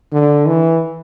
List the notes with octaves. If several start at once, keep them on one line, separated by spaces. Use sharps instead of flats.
D3
E3